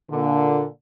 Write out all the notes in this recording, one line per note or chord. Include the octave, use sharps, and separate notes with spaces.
A#2 D3